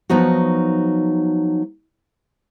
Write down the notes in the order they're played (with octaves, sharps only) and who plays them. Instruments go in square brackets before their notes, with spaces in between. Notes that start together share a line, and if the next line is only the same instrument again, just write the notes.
[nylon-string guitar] F3 F#3 B3 D#4 F#4